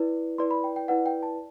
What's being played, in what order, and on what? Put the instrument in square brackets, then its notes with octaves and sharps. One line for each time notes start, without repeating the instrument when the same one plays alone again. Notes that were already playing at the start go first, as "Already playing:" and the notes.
Already playing: [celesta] E4 B4 D5
E4 B4 D5 C6
B5
G5
G5
E4 B4 D5 F#5
G5
A5